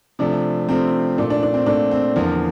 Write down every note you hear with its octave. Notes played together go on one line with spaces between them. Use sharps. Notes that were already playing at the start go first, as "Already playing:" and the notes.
C3 F3 A3 D4
C3 F3 A3 C4
A#2 A3 D4
D4
D4
C4
A#2 A3 D4
C4
E2 D3 F3 A#3 F4